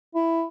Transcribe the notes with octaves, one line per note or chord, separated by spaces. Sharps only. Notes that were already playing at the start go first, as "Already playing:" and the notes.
E4